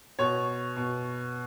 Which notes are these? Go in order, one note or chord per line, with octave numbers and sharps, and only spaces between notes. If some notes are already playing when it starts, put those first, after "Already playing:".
B2 C#5
B2